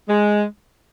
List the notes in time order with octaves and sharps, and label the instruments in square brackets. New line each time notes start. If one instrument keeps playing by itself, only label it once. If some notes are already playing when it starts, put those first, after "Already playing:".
[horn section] G#3